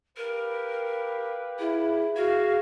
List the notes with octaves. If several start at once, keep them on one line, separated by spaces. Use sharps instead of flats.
G4 A#4 B4 F5
E4 G#4 E5
F#4 G#4 F5